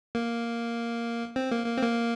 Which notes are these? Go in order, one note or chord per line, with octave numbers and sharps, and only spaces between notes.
A#3
C4
A#3
A#3
C4
A#3